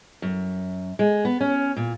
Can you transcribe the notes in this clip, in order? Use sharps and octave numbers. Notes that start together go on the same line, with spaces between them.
F#2
G#3
B3
C#4
A#2